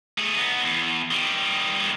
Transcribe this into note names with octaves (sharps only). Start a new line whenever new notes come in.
A3 G#4
B3 D#4
E2
D#3 G3
G2 D#3